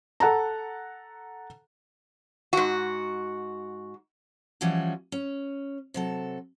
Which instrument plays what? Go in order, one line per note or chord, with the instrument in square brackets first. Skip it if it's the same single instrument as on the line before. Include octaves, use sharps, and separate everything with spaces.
[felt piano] A4 F#5 A5 A#5
[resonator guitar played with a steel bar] G#2 F#4
[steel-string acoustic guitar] E3 F3 G3 C#4 F#4
C#4
C3 F#3 A4